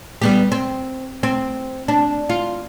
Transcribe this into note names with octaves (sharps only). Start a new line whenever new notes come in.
G3 B3 G4
C4
C4
D4
F4